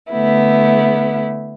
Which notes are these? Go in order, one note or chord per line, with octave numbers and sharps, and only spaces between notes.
D3 A3 B3 E4